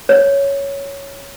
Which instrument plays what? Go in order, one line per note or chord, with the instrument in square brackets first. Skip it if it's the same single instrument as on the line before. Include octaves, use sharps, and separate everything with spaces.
[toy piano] C#5